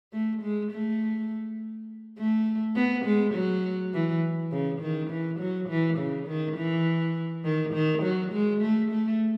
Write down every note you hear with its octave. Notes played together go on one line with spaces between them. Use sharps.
A3
G#3
A3
A3
B3
G#3
F#3
E3
C#3
D#3
E3
F#3
E3
C#3
D#3
E3
D#3
D#3
F#3
G#3
A3
A3